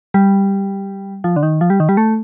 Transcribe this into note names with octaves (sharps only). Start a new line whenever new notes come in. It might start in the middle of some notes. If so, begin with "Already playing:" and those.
G3
F3
D3
D#3
F3
G3
D#3
G3
A3